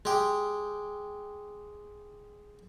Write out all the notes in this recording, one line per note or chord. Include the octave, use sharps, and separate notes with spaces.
G#3 G4